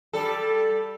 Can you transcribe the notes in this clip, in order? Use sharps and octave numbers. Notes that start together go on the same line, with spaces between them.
G3 A4